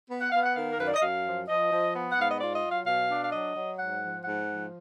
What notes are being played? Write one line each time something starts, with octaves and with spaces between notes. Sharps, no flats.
B3
F#5
B3 F5
F#5
D#3 F5
A#4
F#2 B4
D5
D#5
F#2 F5
F3
F3 D#5
F3
B3
F#5
G#2 F5
D#5
F4 D5
D#5
F#3
F5
B2 F5
D4
F5
F#3 D#5
F#3
G#2 F#5
F3
G#2 F#5
F3